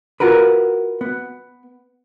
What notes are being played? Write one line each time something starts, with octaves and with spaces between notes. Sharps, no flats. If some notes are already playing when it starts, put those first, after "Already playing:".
F4 F#4 A#4 B4
B3